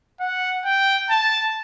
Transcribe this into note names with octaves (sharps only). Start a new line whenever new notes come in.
F#5
G5
A5